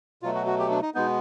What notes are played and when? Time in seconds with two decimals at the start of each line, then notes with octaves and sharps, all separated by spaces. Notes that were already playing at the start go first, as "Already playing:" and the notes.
0.22 B2 F#3 A3 F4
0.35 F#4
0.47 F#4
0.59 G4
0.70 D4
0.82 D#4
0.94 B2 G#3 B3 D#4